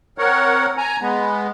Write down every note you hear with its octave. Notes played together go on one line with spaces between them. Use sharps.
C4 A#4 C#5 F#5
G#5 A#5
G#3 B3